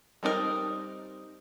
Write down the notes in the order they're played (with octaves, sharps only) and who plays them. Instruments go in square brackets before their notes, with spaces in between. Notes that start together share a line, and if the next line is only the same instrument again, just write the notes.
[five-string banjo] G3 C4 D#4 E4 A#4